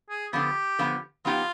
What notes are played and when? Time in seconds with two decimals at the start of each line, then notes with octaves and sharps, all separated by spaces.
0.10 G#4
0.33 D3 F3 B3 G4
0.79 D3 F3 B3
1.25 F3 B3 D#4 F4 G4